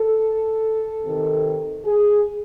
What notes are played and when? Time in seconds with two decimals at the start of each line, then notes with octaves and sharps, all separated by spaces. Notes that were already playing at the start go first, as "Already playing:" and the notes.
Already playing: A4
1.02 C3 D#3
1.85 G#4